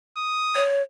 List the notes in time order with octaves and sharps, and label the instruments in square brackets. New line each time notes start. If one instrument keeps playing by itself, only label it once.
[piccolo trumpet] D#6
[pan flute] C#5